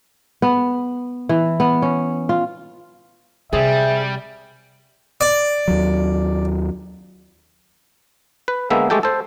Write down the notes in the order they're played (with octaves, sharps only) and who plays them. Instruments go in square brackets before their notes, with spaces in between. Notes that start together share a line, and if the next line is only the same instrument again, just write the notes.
[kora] B3
E3
B3
C#4
F4
[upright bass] C3 [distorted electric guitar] G3 [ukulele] G#4 C5 [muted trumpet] E5
[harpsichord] D5
[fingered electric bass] D#2 F#3
[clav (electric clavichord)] B4
D3 G#3 A#3 B3 E5
G#3 A3 G4 A4 G5
A4 C5